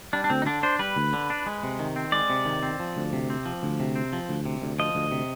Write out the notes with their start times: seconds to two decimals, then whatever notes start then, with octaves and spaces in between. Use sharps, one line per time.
0.13 G3 D4
0.24 D4
0.30 D2 C4
0.42 D#4
0.46 D3 D4
0.63 D4 C5
0.79 G3 B4
0.96 D2
1.13 D3
1.30 D4
1.46 G#3
1.63 C3
1.79 D#3
1.96 C4
2.12 G#3 D5
2.30 C3
2.46 D#3
2.63 C4
2.80 F3
2.97 D2
3.13 C3
3.30 C4
3.46 F3
3.63 D2
3.80 C3
3.95 C4
4.13 F3
4.29 D2
4.46 C3
4.62 D2
4.79 F3 D#5
4.95 D2
5.12 C3